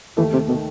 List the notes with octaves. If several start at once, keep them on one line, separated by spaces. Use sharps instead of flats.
D#2 D#3 E3 A3
C3
B2 D#3 A3